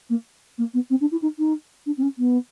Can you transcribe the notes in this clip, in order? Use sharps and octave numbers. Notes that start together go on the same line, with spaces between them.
A#3
A#3
B3
C4
D4
E4
D#4
D#4
D4
C4
C#4
B3